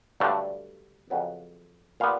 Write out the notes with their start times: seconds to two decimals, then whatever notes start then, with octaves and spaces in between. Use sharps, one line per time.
0.20 G2 D3 F#3 A3 D4
1.10 F2 C#3 F#3 B3
2.00 A#2 G3 B3 F5